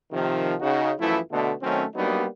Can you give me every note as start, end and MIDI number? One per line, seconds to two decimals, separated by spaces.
0.12 0.54 48
0.12 0.54 51
0.12 0.54 53
0.60 0.92 49
0.60 0.92 63
0.60 0.92 66
0.99 1.19 42
0.99 1.19 52
0.99 1.19 53
0.99 1.19 57
0.99 1.19 64
1.31 1.52 47
1.31 1.52 50
1.31 1.52 57
1.62 1.84 51
1.62 1.84 54
1.62 1.84 57
1.62 1.84 60
1.62 1.84 61
1.95 2.25 54
1.95 2.25 55
1.95 2.25 58
1.95 2.25 59
1.95 2.25 62
1.95 2.25 63